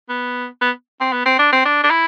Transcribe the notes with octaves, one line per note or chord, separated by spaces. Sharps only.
B3
B3
C4
B3
C4
D4
C4
D4
D4
E4